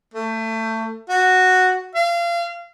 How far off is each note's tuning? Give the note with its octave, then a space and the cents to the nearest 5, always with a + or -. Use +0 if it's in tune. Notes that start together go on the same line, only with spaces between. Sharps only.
A3 +25
F#4 +0
F5 -30